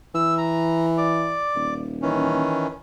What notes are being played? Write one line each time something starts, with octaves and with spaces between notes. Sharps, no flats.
E3 E6
A#5
D5 D6
D#1
D#3 E3 C#4